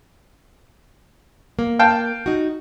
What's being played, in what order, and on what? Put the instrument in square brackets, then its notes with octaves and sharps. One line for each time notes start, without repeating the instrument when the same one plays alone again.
[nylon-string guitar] A#3
[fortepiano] F5 G5 A5
[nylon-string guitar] D#4 F#4